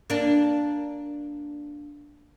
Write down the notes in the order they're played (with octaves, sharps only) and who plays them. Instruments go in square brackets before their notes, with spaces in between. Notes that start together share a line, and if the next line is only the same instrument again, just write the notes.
[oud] A#3 D4